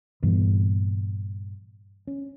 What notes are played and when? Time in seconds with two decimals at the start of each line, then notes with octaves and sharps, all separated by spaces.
0.23 G2 A#2 E3 B3
2.07 C#4